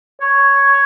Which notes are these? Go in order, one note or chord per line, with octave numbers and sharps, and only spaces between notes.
C#5